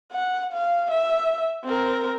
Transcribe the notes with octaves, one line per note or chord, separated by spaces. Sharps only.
F#5
F5
E5
C4 A#4